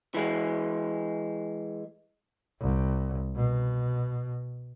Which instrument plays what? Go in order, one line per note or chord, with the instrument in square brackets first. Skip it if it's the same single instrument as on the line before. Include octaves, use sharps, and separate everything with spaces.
[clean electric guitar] E3 G#3
[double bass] C2
B2